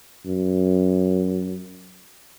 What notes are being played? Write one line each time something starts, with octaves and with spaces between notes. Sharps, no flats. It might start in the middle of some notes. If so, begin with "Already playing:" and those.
F#2